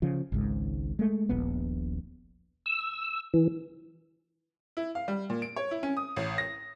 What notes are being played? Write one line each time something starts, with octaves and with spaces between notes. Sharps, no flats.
C#3 F3
G#1 C#2 G#2
G#3 A3
D#1 A#1 B3
E6
E3
E4
F5
G3
A#2
D7
C#5
E4
C#4
D#6
A1
A#6